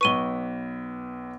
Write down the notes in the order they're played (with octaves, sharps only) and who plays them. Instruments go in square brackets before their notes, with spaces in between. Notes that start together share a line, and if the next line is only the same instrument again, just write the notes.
[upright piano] B1 B4 [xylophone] C#6 D#7 G7